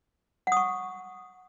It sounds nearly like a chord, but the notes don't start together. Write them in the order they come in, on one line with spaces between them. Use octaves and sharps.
F#5 D#6 C#6